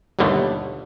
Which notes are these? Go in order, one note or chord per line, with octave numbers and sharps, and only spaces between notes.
G1 D#2 B2 D3 G3 A3